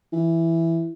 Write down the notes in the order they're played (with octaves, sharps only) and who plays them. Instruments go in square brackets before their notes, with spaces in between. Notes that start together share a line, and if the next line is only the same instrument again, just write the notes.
[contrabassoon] E3